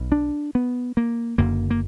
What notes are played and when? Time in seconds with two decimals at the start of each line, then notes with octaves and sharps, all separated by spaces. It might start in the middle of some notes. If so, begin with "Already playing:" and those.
Already playing: B1 B2
0.12 D4
0.55 B3
0.97 A#3
1.38 F#1 F#2 D3 A#3
1.70 A#3